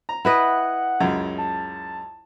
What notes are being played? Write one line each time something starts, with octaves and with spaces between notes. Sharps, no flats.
A#5
E4 B4 D#5 F#5
C#2 F#2 C#3
A5